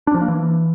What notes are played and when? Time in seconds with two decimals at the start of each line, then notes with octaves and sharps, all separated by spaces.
0.07 D4
0.14 F3
0.21 A#3
0.28 E3